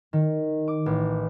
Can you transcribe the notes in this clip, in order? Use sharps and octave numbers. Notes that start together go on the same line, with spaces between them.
D#3
D6
A1